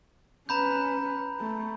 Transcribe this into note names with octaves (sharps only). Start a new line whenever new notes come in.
C#4 B4 A#5 B5 G6
A3